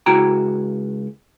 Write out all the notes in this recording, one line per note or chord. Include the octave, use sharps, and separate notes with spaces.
C#2 E4 F#4 G5 A#5